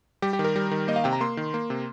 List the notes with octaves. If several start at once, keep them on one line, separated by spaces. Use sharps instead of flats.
G3 G4
G4
D#3
A#4
G3
D#3
A#3 D#5
F5
C3 G5
A#5
A#3 C6
D#3
A#3
C3